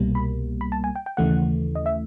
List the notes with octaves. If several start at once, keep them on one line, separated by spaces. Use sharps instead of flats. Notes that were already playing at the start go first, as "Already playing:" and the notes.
Already playing: C2 B2 G3 A#3
B5
B5
A5
G#5
G5
G5
D#2 C#3 E3 A3 F#5
D#5
E5